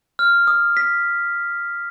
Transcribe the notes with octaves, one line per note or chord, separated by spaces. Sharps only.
F6
D#6
B6